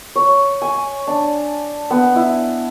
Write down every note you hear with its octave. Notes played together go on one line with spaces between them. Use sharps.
C#5
G#5
D4
B3
E4